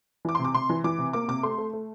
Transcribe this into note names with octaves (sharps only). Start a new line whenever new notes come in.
E3 D6
C6
C3
D6
C3 C6
E3
E3 D6
C3
A#3 D6
C3 D6
A3 C6
A3
A3